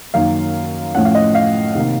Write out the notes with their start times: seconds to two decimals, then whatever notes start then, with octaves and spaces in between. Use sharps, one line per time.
0.14 F#2 D#3 A#3 F5
0.95 A2 F3 A3 C#4 F#5
1.05 F5
1.15 D#5
1.35 F5
1.75 C3 D#3 A#3